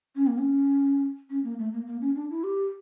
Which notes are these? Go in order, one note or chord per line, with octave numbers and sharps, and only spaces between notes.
C#4
A#3
C#4
C#4
A#3
A3
A#3
A#3
C#4
D4
E4
G4